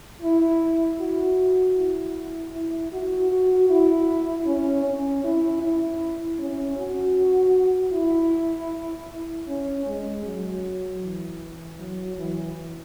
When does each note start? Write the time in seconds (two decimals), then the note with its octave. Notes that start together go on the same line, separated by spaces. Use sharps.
0.22 E4
1.00 F#4
1.77 E4
2.53 E4
2.92 F#4
3.31 F#4
3.69 E4
4.46 C#4
4.85 C#4
5.24 E4
5.62 E4
6.39 C#4
6.77 F#4
7.93 E4
9.48 C#4
9.86 G#3
10.25 F#3
11.02 E3
11.78 F#3
12.17 E3